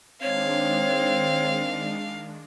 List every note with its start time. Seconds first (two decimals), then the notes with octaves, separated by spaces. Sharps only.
0.23 D#3 G#3 C4 D4 C#5 F5